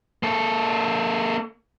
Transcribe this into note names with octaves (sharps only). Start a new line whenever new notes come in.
A#3 A4